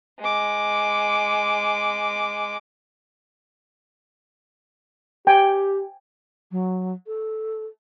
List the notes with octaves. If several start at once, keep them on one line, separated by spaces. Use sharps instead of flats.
G#3 D6
G4 G5 G#5
F#3
A4